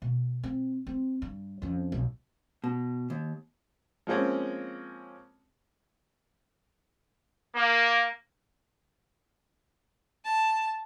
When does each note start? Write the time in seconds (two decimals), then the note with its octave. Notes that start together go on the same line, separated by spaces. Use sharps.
0.02 B2
0.43 C4
0.87 C4
1.22 G2
1.62 F2 C#4
1.92 B1
2.64 B2
3.10 D#2
4.07 F3 G#3 A#3 C4 C#4
7.55 A#3
10.25 A5